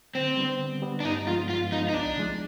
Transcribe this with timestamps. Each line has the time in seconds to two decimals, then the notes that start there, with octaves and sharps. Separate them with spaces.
0.14 D3 C4
0.37 G3 B3 D4
0.59 D3
0.82 G3 B3 D4
1.00 D4
1.04 G2 D#4
1.27 F3 G#3 B3 F4
1.49 G2 F4
1.72 F3 G#3 B3 D#4
1.89 D#4
1.93 C2 D4
2.16 C3 F3 G#3